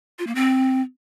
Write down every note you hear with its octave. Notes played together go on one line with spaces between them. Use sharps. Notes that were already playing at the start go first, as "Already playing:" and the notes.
F4
A#3
C4